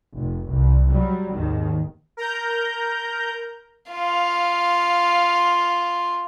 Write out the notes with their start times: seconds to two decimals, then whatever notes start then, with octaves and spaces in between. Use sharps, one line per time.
0.14 F1
0.47 C2
0.89 F#3 G3
1.33 G#1 D#2 D#3
2.17 A#4 A#5 G6
3.90 F4 F5